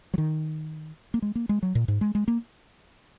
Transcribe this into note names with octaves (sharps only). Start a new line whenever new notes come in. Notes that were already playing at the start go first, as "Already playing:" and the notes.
F#3
D#3
A#3
G#3
A#3
G#3
F#3
A#2
G#2
G#3
G#3
A#3